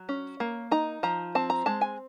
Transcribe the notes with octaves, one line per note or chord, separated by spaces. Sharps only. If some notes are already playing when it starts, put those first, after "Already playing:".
Already playing: F#3
C#4
A#3
D#4 A#5
F3 A#5
C4 A5
A#5
G#3 A5
G#5